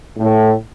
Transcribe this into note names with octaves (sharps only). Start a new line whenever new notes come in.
A2